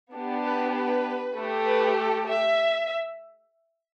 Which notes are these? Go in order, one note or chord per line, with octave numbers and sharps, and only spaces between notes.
B3 D4 G4
B4
B4
A3 G4
B4
A4
E5